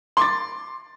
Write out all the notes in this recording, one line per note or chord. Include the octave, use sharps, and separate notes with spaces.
C6 D6 A6